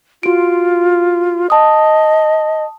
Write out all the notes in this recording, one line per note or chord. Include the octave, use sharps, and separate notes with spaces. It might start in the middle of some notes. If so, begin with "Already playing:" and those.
F4 F#4 D7
D#5 A5 D#6